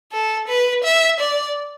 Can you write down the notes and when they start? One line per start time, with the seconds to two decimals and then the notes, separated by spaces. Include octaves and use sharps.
0.12 A4
0.47 B4
0.84 E5
1.20 D5